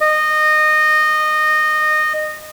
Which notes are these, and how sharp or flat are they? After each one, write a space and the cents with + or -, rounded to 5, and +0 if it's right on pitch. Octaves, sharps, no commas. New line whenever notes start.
D#5 -20